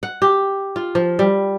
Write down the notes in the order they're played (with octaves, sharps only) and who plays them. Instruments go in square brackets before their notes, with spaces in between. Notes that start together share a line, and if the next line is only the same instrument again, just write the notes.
[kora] F#5
G4
F4
F3
G3